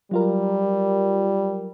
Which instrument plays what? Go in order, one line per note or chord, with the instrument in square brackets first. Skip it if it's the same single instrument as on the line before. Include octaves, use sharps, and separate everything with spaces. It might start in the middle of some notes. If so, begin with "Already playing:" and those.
[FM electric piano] F#3 F4 A#4 [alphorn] G3